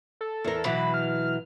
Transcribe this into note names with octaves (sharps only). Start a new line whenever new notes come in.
A4
E2 A4 A#4
B2 E3 F#3 B5
F6